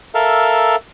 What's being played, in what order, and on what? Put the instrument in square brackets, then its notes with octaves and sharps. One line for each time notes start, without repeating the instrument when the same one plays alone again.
[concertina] A4 A#4 E5 F5